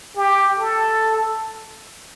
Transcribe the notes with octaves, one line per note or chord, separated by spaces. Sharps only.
G4
A4